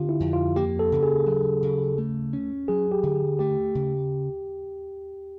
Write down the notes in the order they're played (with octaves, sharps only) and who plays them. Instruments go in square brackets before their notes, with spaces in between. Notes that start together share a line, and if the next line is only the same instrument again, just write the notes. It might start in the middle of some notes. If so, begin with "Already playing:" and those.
Already playing: [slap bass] D3 C4 [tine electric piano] F4 G4
[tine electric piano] E4
[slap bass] F2
[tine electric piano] F4
[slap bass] A#3 [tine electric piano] G4
[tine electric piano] A4
[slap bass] C#3
[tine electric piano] G#4
[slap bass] F#3
C#3
A3
C#4
[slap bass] F#3 [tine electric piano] G#4
[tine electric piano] G4
[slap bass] D3
[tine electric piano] G#4
[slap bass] A3 [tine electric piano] G4
[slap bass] C#3